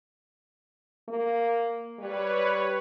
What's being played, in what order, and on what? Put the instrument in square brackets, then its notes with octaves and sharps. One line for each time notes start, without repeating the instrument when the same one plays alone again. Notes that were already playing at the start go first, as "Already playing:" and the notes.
[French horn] A#3
[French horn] G3 [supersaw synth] B4 C#5